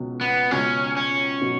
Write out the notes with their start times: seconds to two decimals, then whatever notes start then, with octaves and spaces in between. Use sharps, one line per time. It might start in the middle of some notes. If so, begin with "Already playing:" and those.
Already playing: C#2 B2 F#3
0.21 B3
0.51 C#2 B2 F#3 C#4
0.97 C#4
1.41 B2 F#3